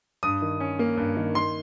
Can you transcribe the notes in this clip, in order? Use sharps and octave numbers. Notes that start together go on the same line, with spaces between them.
G2 D#6
D#3
C#4
A#3
G2
D#3
D#3 C6